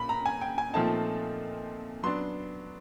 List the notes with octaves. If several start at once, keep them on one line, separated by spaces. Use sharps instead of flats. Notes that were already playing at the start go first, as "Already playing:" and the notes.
Already playing: A#2 B5
A#5
G#5
G5
G#5
A#2 F3 A3 C4 D#4 A5
F#3 B3 D4 C6